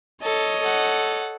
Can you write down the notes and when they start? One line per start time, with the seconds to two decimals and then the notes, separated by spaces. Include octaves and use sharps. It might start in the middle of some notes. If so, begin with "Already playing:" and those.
0.22 A4 C#5 D#5
0.60 A4 F#5